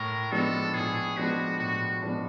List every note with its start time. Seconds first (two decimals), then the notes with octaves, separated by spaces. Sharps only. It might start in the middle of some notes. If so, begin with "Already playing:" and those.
Already playing: A2 A#4
0.32 F3 G#3 B3 D4 A4
0.74 A2 G#4
1.17 F3 G#3 B3 D4 F#4
1.60 A2 F#4
2.02 F3 G#3 B3 D4